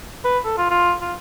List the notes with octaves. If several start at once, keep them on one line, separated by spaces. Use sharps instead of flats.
B4
A4
F4
F4
F4